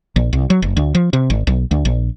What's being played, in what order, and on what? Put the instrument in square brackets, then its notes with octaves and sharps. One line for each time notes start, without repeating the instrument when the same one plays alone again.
[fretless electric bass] A#1
C2
F#3
F#1
D2
F3
C3
G#1
B1
D2
A#1